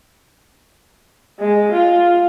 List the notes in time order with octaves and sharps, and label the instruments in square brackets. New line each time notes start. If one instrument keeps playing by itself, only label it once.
[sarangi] G#3
F4